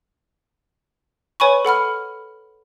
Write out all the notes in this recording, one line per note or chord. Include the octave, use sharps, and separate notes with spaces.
B4 C#5 G#5 B5 C#6
A4 F#5 B5 F6